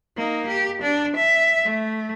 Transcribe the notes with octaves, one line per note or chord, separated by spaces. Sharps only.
A#3 D#4
G4
D4
E5
A3